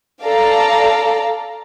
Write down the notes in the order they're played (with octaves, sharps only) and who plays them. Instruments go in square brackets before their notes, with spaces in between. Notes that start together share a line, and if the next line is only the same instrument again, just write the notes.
[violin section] A4 D5 F5 A5 A#5